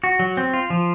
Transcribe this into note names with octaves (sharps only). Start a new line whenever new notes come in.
F#4
F#3
C4
F4
F3